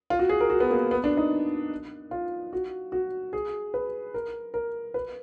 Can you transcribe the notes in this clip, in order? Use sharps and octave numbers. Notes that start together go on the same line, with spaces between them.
F4
F#4
G#4
A#4
F#4
B3
A#3
B3
D4
D#4
F4
F#4
F#4
G#4
B4
A#4
A#4
B4